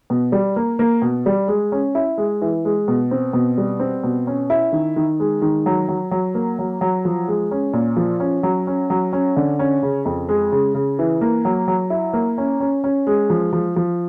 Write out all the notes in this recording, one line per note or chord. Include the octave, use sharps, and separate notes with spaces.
B2
G3
A#3
A#3
B2
G3
G#3
C#4
E4
G#3
E3
G#3
B2
C4
B2
G3
C4
B2
C#4
E4
D#3
D#3
G#3
D#3
F#3
F#3
F#3
A#3
F#3
F#3
F3
G#3
C#4
A#2
F3
C#4
F#3
C#4
F#3
C#4
D3
C#4
C#3
F2
G#3
C#3
C#3
E3
A#3
F#3
F#3
E4
A#3
C#4
C#4
C#4
G#3
F3
F3
F3